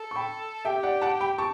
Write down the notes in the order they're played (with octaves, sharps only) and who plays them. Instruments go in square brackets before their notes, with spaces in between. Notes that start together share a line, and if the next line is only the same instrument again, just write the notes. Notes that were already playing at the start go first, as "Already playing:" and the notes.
Already playing: [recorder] A4
[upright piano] C#6
G5 B5
[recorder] G4 [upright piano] E5 G5
[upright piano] D5 F#5
F#5 A5
G5 B5
A5 C#6